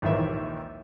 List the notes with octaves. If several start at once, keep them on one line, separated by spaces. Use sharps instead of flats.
A#1 D#2 D#3 E3 E5